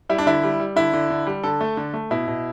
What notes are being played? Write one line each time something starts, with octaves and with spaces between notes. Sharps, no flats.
G3 E4
D4
D3 E4
G3
G3
D3 E4
D3
D3
G3
D3 A4
A3
D3
A3
B2 E4
B2